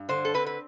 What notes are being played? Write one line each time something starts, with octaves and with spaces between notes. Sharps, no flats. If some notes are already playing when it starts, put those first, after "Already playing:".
Already playing: G2
D3 C5
A4
C4 B4
B4